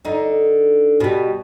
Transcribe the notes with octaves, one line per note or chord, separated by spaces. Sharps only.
D3 D#4
B2 G3